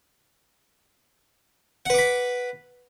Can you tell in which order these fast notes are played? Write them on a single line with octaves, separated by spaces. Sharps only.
F#5 B4 D6 B5